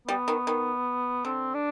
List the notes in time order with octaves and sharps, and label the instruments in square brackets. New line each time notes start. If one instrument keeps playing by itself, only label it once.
[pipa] G3 [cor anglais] B3
[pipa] D#3
D#3
[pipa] D3 [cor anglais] C4
[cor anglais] D4